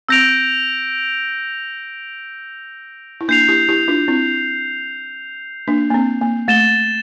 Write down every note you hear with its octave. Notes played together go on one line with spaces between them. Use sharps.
C4 E6 G6 A#6 D7 F7
E4
A#3 D4 G6 C7 F7
E4 G4
E4 G4
D4 F4
C4 E4
A#3 D4
A#3
C4
A#3
A3 A6 E7 G7